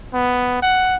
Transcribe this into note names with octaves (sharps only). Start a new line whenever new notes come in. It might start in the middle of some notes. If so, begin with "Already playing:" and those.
B3
F#5